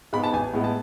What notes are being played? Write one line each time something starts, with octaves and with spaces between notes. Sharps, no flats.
G#2 G#3 B3 B5
A5
A1 G#5
A2 G#3 B3
A5